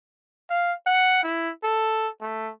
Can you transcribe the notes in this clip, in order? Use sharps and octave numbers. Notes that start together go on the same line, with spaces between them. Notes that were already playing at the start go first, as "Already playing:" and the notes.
F5
F#5
E4
A4
A3